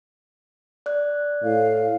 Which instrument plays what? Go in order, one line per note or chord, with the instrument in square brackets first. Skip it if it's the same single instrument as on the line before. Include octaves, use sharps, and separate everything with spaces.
[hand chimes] D5 F#6
[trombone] A2 [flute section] F5